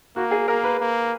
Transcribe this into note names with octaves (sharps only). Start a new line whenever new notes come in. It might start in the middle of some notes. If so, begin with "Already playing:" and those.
A#3 F#4
G#4
A#3 A#4
B4
A#3